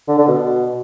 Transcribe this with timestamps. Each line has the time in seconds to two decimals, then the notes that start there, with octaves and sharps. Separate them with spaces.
0.08 D3
0.18 D3
0.28 B2